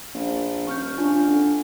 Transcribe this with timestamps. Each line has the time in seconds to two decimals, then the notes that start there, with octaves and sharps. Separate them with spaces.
0.14 A#1
0.67 D#1 C#6 F6 G6
0.98 D4 F4 G#5
1.27 D3